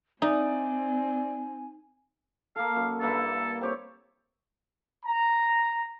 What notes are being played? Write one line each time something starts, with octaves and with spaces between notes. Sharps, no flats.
C4 D#4 D5 E5 G#5
A#3 A4 F5
F#2
G2 A#3 E4 A4
C4 G4 C#5
A#5